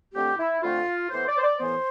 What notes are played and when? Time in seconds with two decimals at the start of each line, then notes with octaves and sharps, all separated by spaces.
0.14 F2 D3 A3 C4 G4
0.38 E4
0.62 F2 D3 A3 C4 F4
1.10 A2 E3 B3 C5
1.27 D5
1.38 C5
1.42 D5
1.58 A2 E3 B3 C5